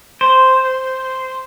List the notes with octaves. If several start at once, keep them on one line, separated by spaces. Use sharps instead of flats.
C5